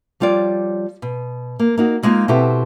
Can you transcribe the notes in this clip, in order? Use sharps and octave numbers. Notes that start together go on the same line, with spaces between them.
F3 G3 F4 C#5 D5
B2
A#3
A#3 D#4 F#4
G3 G#3 A#3 C#4 D#4 F4
B2 C4 E4 G4 A4